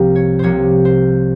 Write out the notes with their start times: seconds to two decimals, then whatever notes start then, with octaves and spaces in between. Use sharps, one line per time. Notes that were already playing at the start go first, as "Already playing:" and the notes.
Already playing: C2 C3 F3 A#3 G4
0.16 C#5
0.39 C2 C3 F3 A#3 C5 C#5
0.85 C5